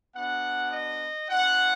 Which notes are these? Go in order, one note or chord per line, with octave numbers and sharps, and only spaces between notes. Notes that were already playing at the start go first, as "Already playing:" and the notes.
B3 D4 F#4 F#5
D#5
B3 D4 F4 F#5